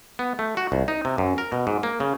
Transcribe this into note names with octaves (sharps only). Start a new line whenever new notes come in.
B3
A3
F#4
C2
D#4
C3
F#2
A#4
B2
G#2
A#3
C#3